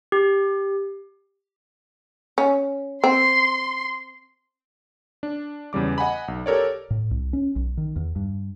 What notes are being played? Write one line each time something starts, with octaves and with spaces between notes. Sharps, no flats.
G4
C#4
C4 C6
D4
E2 C#3 G3 D6
D#5 F#5 G#5 B5
B1
G4 A4 A#4 C#5 D5
A2
C2
C#4
B1
D#3
E2
G2